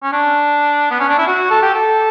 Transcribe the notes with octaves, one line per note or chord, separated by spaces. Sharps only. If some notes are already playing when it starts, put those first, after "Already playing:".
C#4
D4
B3
C#4
D4
E4
F#4
A4
G4
A4